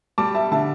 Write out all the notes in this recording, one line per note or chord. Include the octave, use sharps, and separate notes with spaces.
G3 A5 D6
E5 A5
D3 E5 A5